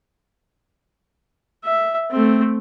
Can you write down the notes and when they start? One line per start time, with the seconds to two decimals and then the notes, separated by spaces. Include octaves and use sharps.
1.64 E5
2.11 A3 C4